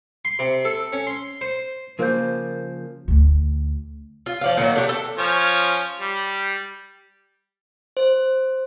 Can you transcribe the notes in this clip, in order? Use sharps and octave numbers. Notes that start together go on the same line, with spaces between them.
C6
C3
A4
C#4
C6
C5
C#3 F3 A#3 A#4 C5 G6
D2 D3
F4
F3 D5 F5
A#2 D#3 F3 F#3
A3 D4 E4 G4
A4
F3 C#4 C#5
G3
C5